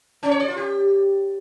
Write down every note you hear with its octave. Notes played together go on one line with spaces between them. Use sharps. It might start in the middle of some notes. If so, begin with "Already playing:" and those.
C#4
C#5
D5
F4
G4